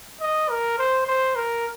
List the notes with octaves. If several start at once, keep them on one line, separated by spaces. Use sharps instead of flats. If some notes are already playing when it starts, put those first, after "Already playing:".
D#5
A#4
C5
C5
A#4